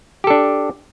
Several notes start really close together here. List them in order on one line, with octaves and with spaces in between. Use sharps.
G4 A4 D4